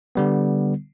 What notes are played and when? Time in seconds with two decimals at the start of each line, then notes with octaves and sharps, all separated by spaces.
0.15 D3 G3 B3